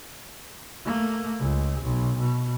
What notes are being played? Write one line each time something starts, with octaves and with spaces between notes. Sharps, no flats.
A3 A#3
C#2
B1
B2